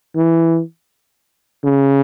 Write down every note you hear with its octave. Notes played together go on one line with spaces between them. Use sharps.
E3
C#3